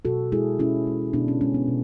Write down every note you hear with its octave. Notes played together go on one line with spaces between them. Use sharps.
B2 F#4 A4
G#3 E4 G#4
B2 C#4 E4
G#3
B2 B3 D4
C#4
G#3 C#4
B3
B2